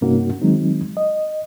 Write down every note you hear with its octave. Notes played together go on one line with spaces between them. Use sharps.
G2 C3 A#3 C#4 D#4 F#4
D#3 F#3 G#3 C4 D#4
D#5